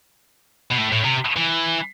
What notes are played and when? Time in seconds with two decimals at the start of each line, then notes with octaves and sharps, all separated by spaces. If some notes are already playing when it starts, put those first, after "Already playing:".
0.71 B2
0.78 A2
0.92 A2
1.05 C3
1.37 E3